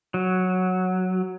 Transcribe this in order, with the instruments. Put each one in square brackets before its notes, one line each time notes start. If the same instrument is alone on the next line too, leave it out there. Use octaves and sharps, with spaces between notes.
[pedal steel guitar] F#3